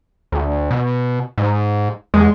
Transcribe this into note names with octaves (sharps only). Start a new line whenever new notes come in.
D2
B2
G#2
E2 G#3